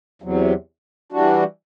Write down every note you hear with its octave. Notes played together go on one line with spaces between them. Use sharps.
E2 C3 F#3
E3 G3 D4 F#4